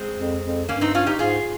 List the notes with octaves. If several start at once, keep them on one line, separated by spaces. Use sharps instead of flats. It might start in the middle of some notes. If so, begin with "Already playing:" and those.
Already playing: G#3 C4
F2
F2
G2 A#3 C#4
C4 D#4
C#4 F4
D#4 G4
G#2 F4 G#4